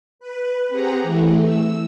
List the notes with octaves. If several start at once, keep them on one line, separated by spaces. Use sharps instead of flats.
B4
C4 G4 G#4 F#5 A#5
E3 A3
E6